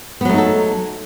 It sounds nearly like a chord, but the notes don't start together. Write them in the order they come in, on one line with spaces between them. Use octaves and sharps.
B3 F#3 A3 D#4 A4